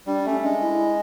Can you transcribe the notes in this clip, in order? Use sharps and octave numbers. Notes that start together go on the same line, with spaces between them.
G3 D4
A3 C#4
G#3 D4
E4